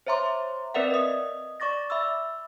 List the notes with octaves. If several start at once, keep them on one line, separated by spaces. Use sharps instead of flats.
C5 C#5 E5 A#5 C6 D6
C4 A#4 B4 D5 E5 F#5
D#5 D#6
D5 C#6 D6 A6 A#6
E5 B5 D6 E6